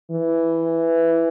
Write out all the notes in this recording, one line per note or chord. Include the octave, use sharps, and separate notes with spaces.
E3